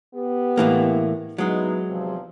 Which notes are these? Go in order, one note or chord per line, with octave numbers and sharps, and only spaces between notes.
B3 G4
A2 E3 A#3
F#3 G#3 B3 D#4 E4
E2 C3 F3